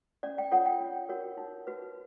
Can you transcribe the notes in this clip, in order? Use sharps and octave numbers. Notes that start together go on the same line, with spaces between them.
C#4 D5
G5
F4 A4 C#5 F#5
G5
D4
F#4 A#4 C#5
D#4
F#4 B4